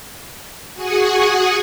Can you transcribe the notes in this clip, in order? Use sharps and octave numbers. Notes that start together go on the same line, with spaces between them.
F#4 G#4 F#5 G#5 C#6 D#6